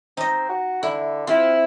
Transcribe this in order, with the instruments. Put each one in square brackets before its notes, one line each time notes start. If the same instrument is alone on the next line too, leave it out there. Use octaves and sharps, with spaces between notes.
[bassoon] C4 [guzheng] D#4 D#5
[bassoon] F#4
[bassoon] D3 [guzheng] E4
[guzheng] C4 [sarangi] E4 [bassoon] F4